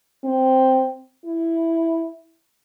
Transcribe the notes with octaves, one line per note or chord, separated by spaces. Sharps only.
C4
E4